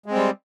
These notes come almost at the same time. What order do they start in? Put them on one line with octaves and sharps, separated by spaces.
G#3 C4 G3